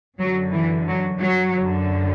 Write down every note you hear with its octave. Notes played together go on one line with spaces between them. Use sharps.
F#2 D3 F#3
E3
F#3
F#3
F#2 D3